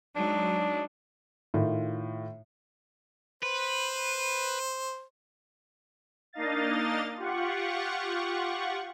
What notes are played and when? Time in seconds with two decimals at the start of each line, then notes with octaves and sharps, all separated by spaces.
0.15 F#3 G#3 D4 D#4
1.54 A2 D#3 F4
3.43 B4 C5
6.33 A#3 D4 D#4 D#5 F5 A6
7.17 F4 G4 F#5 C#6